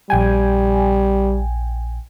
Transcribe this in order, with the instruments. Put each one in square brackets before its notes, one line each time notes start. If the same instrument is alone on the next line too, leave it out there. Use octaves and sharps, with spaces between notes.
[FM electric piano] A#1 G5 G#5 [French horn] G3